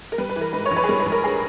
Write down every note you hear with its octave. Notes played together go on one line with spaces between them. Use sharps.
A#4
G3 B4
B4
E3
A#4
G#2 B4
C#5
A#1
B4
G#4
G3 A#4
B4
A#1
A#4
G#4